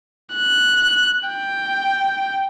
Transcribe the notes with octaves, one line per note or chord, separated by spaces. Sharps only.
F#6
G5